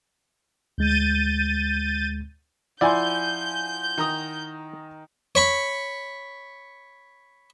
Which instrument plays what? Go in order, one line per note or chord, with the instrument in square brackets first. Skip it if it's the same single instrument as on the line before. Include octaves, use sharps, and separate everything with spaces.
[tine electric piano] D2 G#3 [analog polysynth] G6 A6 D#7
[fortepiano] F3 [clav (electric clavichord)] E4 D5 [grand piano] F#5 G#5 C6 [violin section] G6
[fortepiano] D#3 A#5 D#6
[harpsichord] C#5 B5 C#6